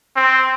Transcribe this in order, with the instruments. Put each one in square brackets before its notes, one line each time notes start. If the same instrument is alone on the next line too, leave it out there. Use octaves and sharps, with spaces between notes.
[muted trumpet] C4